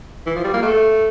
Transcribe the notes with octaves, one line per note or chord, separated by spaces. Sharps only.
E3
F3
G3
A#3
A3